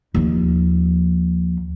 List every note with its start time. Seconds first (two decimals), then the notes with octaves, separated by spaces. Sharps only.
0.14 D#2 F3